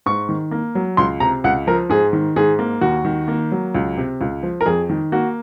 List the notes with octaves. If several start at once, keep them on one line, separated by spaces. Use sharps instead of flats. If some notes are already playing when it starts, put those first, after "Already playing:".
G#2 C#6
D#3
A#3
F#3
C#2 C6
C3 A#5
C#2 F#5
F3 A#4
G#2 G#4
D#3
G#2 G#4
A#3
D#2 F#4
D#3
A#3
F#3
C#2
C3
C#2
F3
A#4
F2 G#4
D#3
A#3 F#4